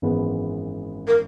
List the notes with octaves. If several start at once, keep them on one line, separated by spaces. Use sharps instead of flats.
G#1 F#2 E3 G#3 B3
A#4